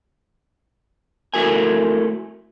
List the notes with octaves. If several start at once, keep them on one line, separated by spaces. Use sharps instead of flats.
A3 E4 F#4 A#4 G#5